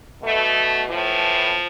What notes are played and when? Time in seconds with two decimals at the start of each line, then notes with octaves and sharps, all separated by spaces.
0.22 B2 A3
0.89 A2 E3 F3